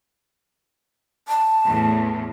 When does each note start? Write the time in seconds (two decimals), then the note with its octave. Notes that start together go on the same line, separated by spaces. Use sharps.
1.28 A5
1.66 E2 A2